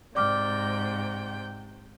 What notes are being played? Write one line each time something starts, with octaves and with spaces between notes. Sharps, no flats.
G#2 C3 D5 G5 D6 F6